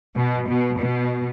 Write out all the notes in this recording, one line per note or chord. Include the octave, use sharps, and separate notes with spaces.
B2
B2
B2